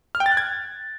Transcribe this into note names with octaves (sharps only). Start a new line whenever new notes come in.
F6
G5
A6
F#6
G#6